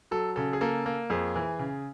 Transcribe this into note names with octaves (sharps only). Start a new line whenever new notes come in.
F#3 A4
C#3 A4
G#4
A#3 A4
A#3
F2 G#4
E3
C#3